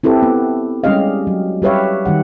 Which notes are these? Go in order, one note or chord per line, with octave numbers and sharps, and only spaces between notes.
C4 E4 G4 A4 B4
B3
G3 G#3 C#4 G4 D#5 F5
F#3
G3 G4 B4 C#5 E5 F5
D#3 G3 F#5